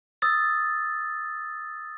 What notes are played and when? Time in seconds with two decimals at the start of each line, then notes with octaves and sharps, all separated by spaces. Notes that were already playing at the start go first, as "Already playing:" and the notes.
0.22 D#6 E6 A6